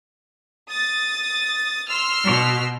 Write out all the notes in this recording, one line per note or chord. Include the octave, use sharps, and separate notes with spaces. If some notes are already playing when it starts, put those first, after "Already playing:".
D#6 A6
C6 E6 F6
B2